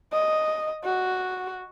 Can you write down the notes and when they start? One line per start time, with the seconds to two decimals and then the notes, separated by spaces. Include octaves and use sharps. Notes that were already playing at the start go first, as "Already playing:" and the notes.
0.13 D#5
0.84 F#4